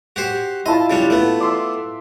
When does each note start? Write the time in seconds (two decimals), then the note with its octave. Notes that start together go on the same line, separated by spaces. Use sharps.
0.16 F#4 G4 C5
0.66 E4 F4 D#5 A5
0.90 C#3 G3 D4
1.10 A3 B3 F5
1.40 E5 C6 D6